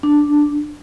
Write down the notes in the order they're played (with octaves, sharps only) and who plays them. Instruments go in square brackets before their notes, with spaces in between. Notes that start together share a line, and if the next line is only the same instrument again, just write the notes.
[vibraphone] D4